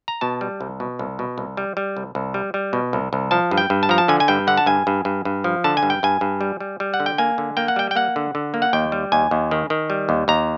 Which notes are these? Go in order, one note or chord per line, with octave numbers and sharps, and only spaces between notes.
A#5
B2 A5
G3
C2
B2
C2
B2
C2
G3
G3
C2
C2
G3
G3
B2
C2
C2
F3 A5
G2
G5
G2
A5
F3 A#5
A5
D3 G#5
G#5
G2 G5
D3 F#5
A5
G2 G#5
G2
G2
G2
F3
D3 A5
G#5
G2
G5
G2 G#5
G2
G3
G3
G3
F#5
D3
G5
A#3 G#5
D3
A#3 G5
F#5
G3 G5
G5
A#3 F#5
D3
D3
A#3
F#5
D#2 G5
G3
D#2 G#5
D#2
D#3
D#3
G3
D#2
D#2 A#5